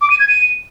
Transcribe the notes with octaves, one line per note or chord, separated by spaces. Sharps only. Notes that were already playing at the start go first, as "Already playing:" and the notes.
D6
D#7
G#6
D#7